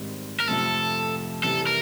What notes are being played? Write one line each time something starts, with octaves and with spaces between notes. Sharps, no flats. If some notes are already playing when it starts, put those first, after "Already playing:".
Already playing: G#2 D#3 G3 C4
A#4
F2 C3 F3 A3 A4
C3 E3 G3 A4
A#4